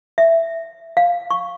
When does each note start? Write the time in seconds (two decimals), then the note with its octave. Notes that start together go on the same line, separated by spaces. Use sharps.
0.18 E5
0.97 F5
1.31 C#6